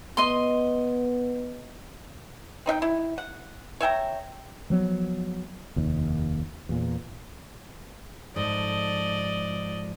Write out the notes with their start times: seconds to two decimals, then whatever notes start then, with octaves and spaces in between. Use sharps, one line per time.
0.17 B3 D#5 C6
2.66 C4 D#4 E5 G5
2.82 E4
3.18 F#5
3.80 C#5 E5 G5 A#5
4.70 F3 F#3 B3
5.76 F1 D#2
6.69 E2 A#2
8.36 G#2 F3 A4 D5 D#5